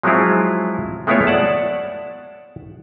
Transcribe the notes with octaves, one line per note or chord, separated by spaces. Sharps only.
F3 F#3 G#3 C4 E4 F4
G#3 A3 B3 E4 F4 C#5
D5 F#5 A5